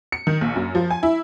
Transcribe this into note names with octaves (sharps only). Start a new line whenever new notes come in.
C#7
D#3
A#1
F#2
F3
G#5
E4